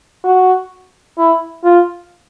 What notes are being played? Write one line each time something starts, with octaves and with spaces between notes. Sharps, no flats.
F#4
E4
F4